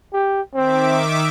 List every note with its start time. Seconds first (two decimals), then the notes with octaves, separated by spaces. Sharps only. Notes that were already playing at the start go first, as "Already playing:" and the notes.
0.13 G4
0.55 D#3 C4 E5 D6